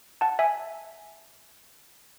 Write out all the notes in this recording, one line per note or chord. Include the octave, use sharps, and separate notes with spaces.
F#5 A5
E5 G#5